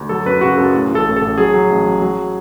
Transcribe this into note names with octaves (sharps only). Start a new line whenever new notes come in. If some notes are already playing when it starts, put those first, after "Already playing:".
Already playing: D2
F#3 A4
F#2 B4
C#3 F#4
F#2 A4
A2
A1 A4
A2
A4
A1
F#3 G#4
F#3
A1
F#3
F#3